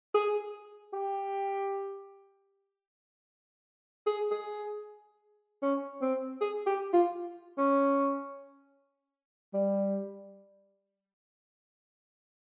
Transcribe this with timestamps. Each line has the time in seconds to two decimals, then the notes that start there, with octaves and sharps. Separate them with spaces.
0.14 G#4
0.93 G4
4.06 G#4
4.31 G#4
5.62 C#4
6.02 C4
6.41 G#4
6.66 G4
6.93 F4
7.58 C#4
9.54 G3